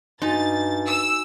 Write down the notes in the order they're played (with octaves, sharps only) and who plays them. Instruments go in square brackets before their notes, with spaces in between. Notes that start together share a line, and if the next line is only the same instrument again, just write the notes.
[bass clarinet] G2 [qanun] D#4 [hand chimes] F#4 G#5 C6 [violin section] A6
[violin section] E6